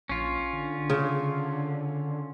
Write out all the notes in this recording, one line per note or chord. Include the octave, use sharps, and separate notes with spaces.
A#1 C#4 F4
D3
C#3